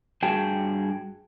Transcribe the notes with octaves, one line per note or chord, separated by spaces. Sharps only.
G2 F#4 G#4 G5 A5